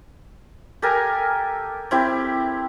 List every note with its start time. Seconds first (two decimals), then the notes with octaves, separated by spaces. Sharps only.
0.82 G4 A4 A#4 G#5
1.91 C4 E4 G4